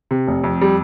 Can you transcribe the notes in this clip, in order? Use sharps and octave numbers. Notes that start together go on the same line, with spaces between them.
C3
F1
F2
G3